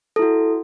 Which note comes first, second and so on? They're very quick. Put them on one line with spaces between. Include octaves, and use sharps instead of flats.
A4 E4 F#4